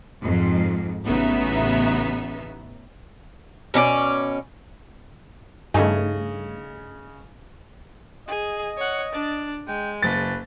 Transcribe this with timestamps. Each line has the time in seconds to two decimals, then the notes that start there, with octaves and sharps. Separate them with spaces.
0.23 F2 G#2
1.05 A1 C#3 B3 D#4 E5
3.74 B2 C#4 D4 D5
5.74 G2 C#3 A3 D#4 D#5 G#5
8.28 G#4 D#5
8.77 C#5 F#5
9.13 D4 D5
9.68 G#3 G5
10.02 F#1 B4 A6